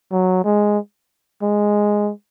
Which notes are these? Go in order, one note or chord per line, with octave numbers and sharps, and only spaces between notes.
F#3
G#3
G#3